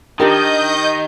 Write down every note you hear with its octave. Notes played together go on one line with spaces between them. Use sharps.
D#3 D4 D#4 G4 A#4 D#5 G6